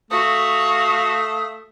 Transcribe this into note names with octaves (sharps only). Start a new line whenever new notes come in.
A3 F#4 F5 D#6